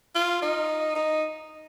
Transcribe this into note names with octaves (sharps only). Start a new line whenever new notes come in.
F4
D#4
D#4